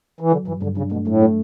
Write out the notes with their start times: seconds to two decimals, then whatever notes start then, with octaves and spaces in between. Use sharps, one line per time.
0.20 E3
0.32 D3 F#3
0.47 G2 E3
0.62 G2 D3
0.77 C#3 D4
0.92 B2 A3
1.07 A2 A3
1.22 A3